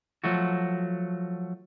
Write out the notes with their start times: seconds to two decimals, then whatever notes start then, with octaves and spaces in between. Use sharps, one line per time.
0.24 F3 F#3 A3 F#4